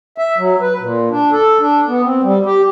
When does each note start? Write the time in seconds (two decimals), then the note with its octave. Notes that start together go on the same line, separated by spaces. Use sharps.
0.18 E5
0.38 F#3
0.61 B4
0.81 A#2
1.11 D4
1.32 A4
1.60 D4
1.88 B3
2.04 C4
2.23 G3
2.46 G4